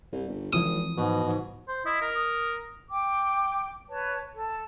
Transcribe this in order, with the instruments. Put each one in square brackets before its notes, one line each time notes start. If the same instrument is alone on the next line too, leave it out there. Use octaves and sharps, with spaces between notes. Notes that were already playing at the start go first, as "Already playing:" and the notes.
[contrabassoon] C2 [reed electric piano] G2
[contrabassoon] G1
[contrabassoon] G#1 [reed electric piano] E3 F3 E4 [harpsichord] D#6
[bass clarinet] G#2 [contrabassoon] B2
[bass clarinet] G#2
[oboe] C5
[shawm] E4 [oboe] D#5
[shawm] A#4
[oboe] D#6
[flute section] G5 D6
B4 C#5 A5
A4